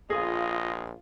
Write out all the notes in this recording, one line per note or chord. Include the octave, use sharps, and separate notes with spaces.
A#1 F4 G#4 D#5